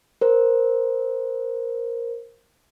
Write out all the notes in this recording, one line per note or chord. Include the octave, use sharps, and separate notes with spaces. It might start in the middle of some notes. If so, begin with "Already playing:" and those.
A#4 C5